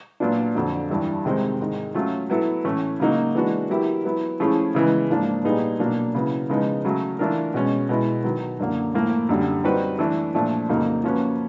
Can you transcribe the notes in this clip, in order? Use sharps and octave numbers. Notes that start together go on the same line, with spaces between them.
A#2 F#3 B3 D4 F4
F2 D3 F#3
G2 E3 G3
C3 D#3 G#3 C4 D#4
G#2 D#3 G#3
F#3 A3 C#4 F4
F#3 B3 E4 A4
A2 E3 A3 C#4
C#3 F#3 A#3 D#4 F#4
E3 G#3 B3 D4 F#4
F#3 B3 E4 G4 A#4
F#3 B3 E4
F3 A3 C#4 E4 G#4
C#3 E3 G#3 B3
G#2 F3 A#3 D4
A#2 G3 B3 D#4 G#4
B2 F#3 A#3 D4
C#3 F#3 B3 E4
C#3 F3 G#3 B3 D#4
C#3 F#3 A3
E3 A3 D4 F4 A#4
B2 G#3 C#4
B2 G#3 B3 E4
D#3 F#3 B3
F#2 D3 F#3 A#3
A2 F3 A#3
F#2 D3 G3
G3 C4 D#4 F#4 B4
E3 A3 D4
A#2 F3 A3 D4
F2 C#3 F#3 A#3 D#4
F3 A#3 C#4 F#4 B4